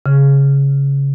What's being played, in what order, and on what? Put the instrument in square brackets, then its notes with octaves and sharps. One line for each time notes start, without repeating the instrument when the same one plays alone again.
[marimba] C#3